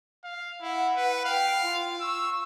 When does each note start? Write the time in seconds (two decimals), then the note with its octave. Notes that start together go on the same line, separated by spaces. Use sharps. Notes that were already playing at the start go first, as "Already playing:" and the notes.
0.24 F5
0.61 E4 F#5
0.96 B4
1.25 F5 G5
1.62 F4
2.00 C#6 E6